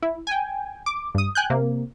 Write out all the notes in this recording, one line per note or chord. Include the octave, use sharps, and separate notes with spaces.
E4
G5 G#5
D6
G2 D#6
G5 G#5 F#6 G6
C3 A#3